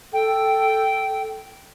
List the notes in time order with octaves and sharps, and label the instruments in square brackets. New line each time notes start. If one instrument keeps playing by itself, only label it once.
[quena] A4 [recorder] G5